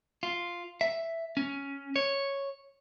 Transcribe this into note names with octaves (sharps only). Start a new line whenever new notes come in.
F4
E5
C#4
C#5